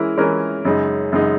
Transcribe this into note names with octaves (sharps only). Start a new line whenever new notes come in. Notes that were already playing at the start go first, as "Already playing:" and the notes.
Already playing: E3 G#3 C#4 E4 A#4
E3 G#3 C#4 E4 A#4
F#2 C#3 G#3 D#4
F#2 C#3 G#3 D#4